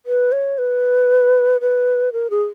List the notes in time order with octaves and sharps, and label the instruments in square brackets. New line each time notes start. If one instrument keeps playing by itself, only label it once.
[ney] B4
C#5
B4
B4
A#4
G#4